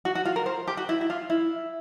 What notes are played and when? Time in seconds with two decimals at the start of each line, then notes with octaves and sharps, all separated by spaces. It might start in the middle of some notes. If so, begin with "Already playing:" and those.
0.05 F#4
0.15 F#4
0.25 F4
0.36 A#4
0.46 C5
0.67 G4
0.77 F#4
0.89 E4
1.01 E4
1.10 F4
1.30 E4